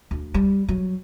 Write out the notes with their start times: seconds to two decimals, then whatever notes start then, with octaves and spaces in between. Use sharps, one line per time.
0.11 D2
0.34 G3
0.69 F#3